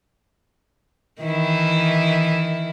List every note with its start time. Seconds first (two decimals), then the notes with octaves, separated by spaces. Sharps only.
1.22 D#3 E3 E4